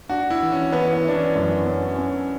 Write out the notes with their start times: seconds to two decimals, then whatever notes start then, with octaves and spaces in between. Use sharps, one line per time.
0.09 D4 F#4
0.30 E4
0.41 E3
0.52 C#4
0.72 E3 B3
0.93 B3
1.04 E3 D4
1.15 C#4
1.35 F#2
1.67 C#4
1.98 C#4